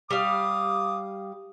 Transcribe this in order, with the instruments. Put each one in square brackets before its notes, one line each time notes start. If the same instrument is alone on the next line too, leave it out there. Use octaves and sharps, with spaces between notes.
[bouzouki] G3 F5 [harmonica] D6 D#6